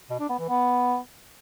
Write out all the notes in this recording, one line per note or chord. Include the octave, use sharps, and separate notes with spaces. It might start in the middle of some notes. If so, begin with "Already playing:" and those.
B2
D4
B3
E3
B3